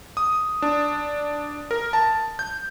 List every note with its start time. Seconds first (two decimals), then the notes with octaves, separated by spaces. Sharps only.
0.17 D#6
0.62 D4
1.71 A#4
1.93 A5
2.39 G6